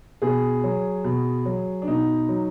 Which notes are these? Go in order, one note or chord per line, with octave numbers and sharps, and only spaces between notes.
B2 G#4
F#3
B2
F#3
D4
B2 D#4
F#3